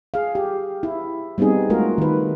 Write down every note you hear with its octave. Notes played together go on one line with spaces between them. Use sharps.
G#4 F5
G4
E4
G3 B3 C4 D#4 G#4
G#3 A3 F4 F#4 A#4
D#3 B4